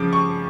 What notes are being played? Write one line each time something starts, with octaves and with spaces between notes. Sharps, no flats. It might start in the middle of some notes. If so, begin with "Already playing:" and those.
Already playing: C#3 F3 D6
C#6